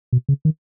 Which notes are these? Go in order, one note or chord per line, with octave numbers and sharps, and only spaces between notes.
B2
C#3
D#3